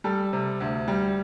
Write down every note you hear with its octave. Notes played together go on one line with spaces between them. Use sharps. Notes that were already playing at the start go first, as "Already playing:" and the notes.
G3 A4
C3
D2
G3